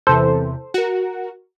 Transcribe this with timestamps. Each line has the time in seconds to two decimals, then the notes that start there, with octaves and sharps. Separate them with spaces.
0.07 E2 C3 E3 A4 C5
0.74 F#4 A#4